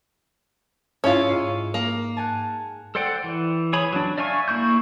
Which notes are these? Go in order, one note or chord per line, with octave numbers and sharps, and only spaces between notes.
G#2 C#4 E4 F4
G#2 F5 D#7
A#3
F#5 G#5 A5
A4 C5 D5 F#5 G5
E3
G#4 C#5 B5
F#3 D4
D5 E5 F5 G#5 C#6
A#3 E4 C#6 G6